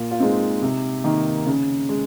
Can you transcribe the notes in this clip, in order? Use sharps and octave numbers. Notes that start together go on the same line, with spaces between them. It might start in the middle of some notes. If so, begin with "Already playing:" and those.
Already playing: A#2 F4
F4
G#3 C4 D#4
C3
D#3 A#3
C#3
G#3